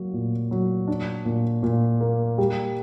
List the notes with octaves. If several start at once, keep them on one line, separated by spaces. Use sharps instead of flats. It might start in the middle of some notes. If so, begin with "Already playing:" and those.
Already playing: F#3 A#3
A#2
F#3
D4
A#2
A#2
A#3
G3